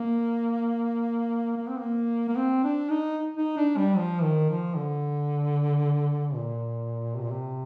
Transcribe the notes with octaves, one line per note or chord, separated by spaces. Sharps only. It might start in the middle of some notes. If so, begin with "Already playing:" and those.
Already playing: A#3
A#3
C4
A#3
A#3
C4
D4
D#4
D#4
D4
G3
F3
D#3
F3
D3
A#2
C3
A#2
C3